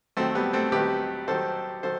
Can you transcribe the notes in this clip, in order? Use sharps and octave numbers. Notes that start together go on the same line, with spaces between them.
D#2 D#3 F#3 A3 C4
G3 B3
A3 C4
D#2 D#3 F#3 G4 B4
D#2 D#3 F#3 A4 C5
D#3 F#3 A4 C5